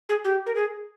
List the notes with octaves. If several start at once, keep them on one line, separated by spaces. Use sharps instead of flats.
G#4
G4
A#4
G#4